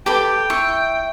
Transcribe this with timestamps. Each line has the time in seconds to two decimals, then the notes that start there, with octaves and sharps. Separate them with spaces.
0.06 G4 A4 B4 G5 B5 D6
0.50 E4 C#6